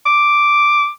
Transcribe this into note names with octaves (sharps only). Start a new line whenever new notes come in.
D6